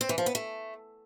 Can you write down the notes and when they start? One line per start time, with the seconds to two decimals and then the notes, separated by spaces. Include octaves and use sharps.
0.01 C4
0.09 E3
0.18 F3
0.26 B3
0.35 A3